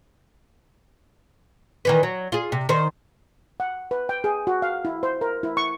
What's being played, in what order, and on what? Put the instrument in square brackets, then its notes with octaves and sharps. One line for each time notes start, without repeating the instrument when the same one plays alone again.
[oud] D#3 E3 B4
F#3
F4 G#4
C3
D#3 C5
[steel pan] F#5
B4
G5
G#4
F#4
F5
E4
C5
A#4
E4
C#6